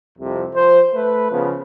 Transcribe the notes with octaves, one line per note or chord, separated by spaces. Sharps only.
C2 F2 C3
F3 C5
A3 B4
C#3 F3 B3